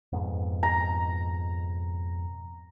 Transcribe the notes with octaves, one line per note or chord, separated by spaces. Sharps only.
F2 G#2 B2
A#5